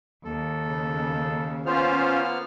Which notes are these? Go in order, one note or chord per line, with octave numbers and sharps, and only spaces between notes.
D#2 A4
C#3
A#3 B3 C#4 F4 C5 F6